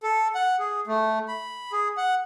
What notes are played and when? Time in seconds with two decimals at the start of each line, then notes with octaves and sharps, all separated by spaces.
0.03 A4
0.35 F#5
0.59 G#4
0.87 A3
1.28 B5
1.72 G#4
1.97 F#5